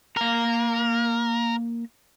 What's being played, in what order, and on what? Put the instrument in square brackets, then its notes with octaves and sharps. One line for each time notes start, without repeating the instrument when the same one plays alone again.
[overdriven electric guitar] A#3 A#5 [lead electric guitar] A#4